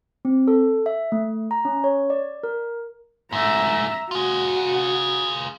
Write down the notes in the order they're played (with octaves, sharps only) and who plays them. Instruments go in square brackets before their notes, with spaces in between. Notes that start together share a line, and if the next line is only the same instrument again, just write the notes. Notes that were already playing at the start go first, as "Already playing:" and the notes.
[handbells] C4
A4
E5
A3
A#5
C#4
C#5
D5
A#4
[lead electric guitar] G#2 A3 [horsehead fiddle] E5 A#5
[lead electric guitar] F4 G#4 [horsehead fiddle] F#4